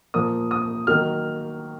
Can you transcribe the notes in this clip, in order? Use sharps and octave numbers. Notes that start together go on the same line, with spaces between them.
A#2 F3 A#3 D#6
D#6
D#3 F#3 A#3 F6